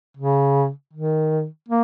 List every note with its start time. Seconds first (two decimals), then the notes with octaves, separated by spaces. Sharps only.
0.17 C#3
0.93 D#3
1.68 A#3